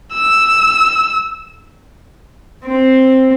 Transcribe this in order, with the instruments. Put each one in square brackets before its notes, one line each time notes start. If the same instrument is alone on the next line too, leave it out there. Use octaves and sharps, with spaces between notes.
[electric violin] E6
[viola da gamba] C4